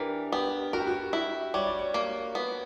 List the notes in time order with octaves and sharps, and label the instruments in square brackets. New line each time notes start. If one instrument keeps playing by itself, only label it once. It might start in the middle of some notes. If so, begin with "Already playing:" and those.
Already playing: [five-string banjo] E3 [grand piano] D4 G4 A#4
[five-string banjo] B3 [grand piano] G4
[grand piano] F#4 [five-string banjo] A#4
[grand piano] G4
F#4
[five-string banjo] E4
[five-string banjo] G3 [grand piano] C#5
[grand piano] D5
C#5
[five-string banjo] A#3
B3